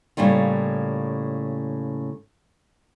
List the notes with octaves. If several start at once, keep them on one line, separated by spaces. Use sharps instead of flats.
A2 C#3 G3 A#3 F4